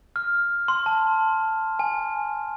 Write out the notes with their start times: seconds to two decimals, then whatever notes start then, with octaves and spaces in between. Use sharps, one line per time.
0.16 F6
0.68 C6
0.86 A5
1.79 G#5